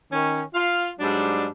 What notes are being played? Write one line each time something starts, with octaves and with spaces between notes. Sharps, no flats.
D#3 C#4
F4 F5
G#2 F#3 G3 D4